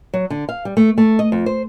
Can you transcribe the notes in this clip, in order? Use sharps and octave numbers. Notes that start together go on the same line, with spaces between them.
F#3
D3
F5
G3
A3
A3
D#5
F2
C5